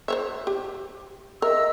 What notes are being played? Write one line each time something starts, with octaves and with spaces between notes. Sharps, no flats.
C5 C#5 E5
G4
A#4 D#5 E5 E6